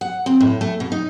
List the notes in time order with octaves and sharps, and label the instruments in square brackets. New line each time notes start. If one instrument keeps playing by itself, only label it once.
[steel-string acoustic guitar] F#5
C4
A2
A3
B2
D#4